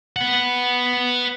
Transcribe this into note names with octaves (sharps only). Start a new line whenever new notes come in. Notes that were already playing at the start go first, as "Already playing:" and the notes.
B4 F#5